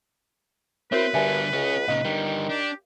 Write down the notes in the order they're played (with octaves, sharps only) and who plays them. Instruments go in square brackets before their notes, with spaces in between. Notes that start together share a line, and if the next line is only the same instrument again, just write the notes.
[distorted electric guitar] C4 [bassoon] E4 [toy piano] F#4 A#4 C#5 [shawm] B4
[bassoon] G2 [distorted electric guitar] D3 G3 [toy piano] E5 G#5
[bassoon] C#2 [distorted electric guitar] C#4 G#4
[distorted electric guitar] A#2 C#3 [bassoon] D#4 [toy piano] F5
[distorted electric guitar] D3 G3 [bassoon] D#3
[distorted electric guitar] D4 [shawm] G4